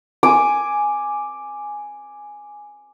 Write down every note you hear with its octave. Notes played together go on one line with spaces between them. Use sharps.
G#5 D6